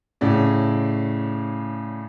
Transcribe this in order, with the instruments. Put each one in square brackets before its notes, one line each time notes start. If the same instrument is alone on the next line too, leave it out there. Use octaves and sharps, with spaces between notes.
[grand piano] A2 C#3 D5